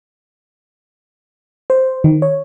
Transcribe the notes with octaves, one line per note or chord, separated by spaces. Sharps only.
C5
D#3
C#5